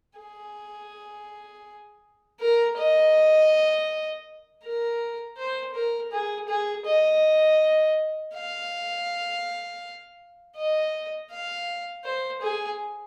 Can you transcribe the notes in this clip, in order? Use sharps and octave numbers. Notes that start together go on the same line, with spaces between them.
G#4
A#4
D#5
A#4
C5
A#4
G#4
G#4
D#5
F5
D#5
F5
C5
G#4